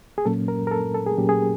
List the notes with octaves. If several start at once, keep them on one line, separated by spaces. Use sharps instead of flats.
G#4
A#2 F#3 A#3 C#4 A4
A#4
A#4
A4
A4
G#4
A#2 F#3 A#3 C#4 G4
G#4